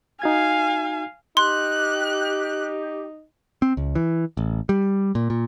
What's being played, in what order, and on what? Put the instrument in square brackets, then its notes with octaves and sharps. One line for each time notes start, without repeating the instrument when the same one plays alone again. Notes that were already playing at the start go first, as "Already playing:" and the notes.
[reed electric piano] D#4 F#4 G#6 [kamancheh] F5 G#5
[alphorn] D#4 [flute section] G4 [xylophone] C6 [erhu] F#6
[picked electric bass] C4
C#2
E3
A1
G3
A#2
A#2